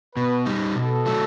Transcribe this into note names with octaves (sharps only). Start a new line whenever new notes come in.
B2 B4
G3 D#4
B2 A4
F#3 A3